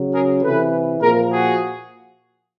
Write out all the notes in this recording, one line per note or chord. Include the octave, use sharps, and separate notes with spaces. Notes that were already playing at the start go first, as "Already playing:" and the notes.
Already playing: C#3 F#3
G#4 A#4
C3 E3 A4 B4
A#2 F3 G#4 A#4
F#4 G#4